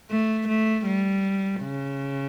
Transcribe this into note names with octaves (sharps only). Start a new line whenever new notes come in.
A3
A3
G3
C#3